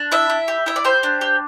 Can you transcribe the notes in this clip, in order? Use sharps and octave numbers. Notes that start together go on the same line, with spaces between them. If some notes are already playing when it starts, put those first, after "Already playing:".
Already playing: D4
E4 E5
E4
G4
E4 E5
D5
G4 C5
D4
G4